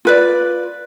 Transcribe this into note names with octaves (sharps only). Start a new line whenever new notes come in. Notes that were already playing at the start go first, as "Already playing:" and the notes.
F4 B4 D5